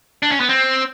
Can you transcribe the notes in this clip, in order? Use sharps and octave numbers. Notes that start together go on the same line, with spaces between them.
D4
C#4
B3
C4